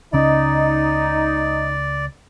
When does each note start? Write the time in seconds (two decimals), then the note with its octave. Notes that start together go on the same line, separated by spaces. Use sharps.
0.13 C#2 C#3 C#4 D#4 D5